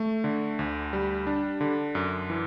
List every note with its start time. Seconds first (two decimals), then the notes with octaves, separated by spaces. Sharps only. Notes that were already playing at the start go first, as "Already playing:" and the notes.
Already playing: A3
0.24 D3
0.59 D2
0.93 G3
1.27 D4
1.61 D3
1.95 F#2
2.30 E3